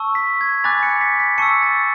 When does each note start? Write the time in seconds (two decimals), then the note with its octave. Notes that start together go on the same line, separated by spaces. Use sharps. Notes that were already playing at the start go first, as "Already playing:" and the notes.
Already playing: A5 C#6 E6
0.15 B6
0.41 G#6
0.64 G#5 B5 D6 F#6 A6
0.83 C#7
1.01 B6
1.20 B6
1.38 A5 C#6 E6 C#7
1.62 A6